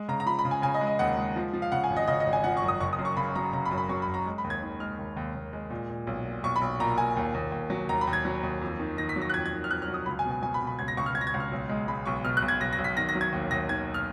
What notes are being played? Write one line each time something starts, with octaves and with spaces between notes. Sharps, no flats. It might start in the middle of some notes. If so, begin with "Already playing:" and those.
Already playing: G#3
C#3 A#5
A#5
F3 B5
B5
C#3
G#5
C#3 G#5
D#5
G#3
D#5
D#2 F#5
G#3
F3
F3
F5
C#3 F#5
G#5
G#1
D#5
C#3 D#5
D#5
G#1
G#5
F3 F#5
C#6
F#2
D#6
F#1 C#6
D#6
F#2
C#6
C#3 B5
F#3 A#5
C#3 A#5
B5
F#2
B5
F#3 C#6
B5
F#1
A#5
G#3
B5
D#2
G#6
D#3
G#3 F6
D#2
D#2
D#2
G#3
A#2
A#2
B1
A#2
B1 C#6
B5
B1
A#2 A#5
A#2 G#5
D#2
D#2
D#2
F#3
D#2 A#5
B5
D#2
G#6
F#3
D#2
F2
D#3
D#3 A#6
B6
F#3
A#6
F#6
F2 G#6
G#6
D#3
F6
F2 F#6
F6
F#3
D#6
C#2 B5
G#5
B2
G#5
F#3 G#5
B5
B2
B5
C#2 G#6
A#6
C#2 C#6
F6
C#2 G#6
A#6
G#6
C#2
F6
B1
G#3
G#3 B5
B1 C#6
B2 F6
F#6
B1
G#6
B1 A#6
A#6
B1
B6
D#3 A#6
A#6
F#3
G#6
D#2
D#2 A#6
D#3 G#6
F6